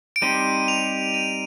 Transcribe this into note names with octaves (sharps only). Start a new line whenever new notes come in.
D7
G3 C4 D#4 G4 C5 D#7
F7
D#7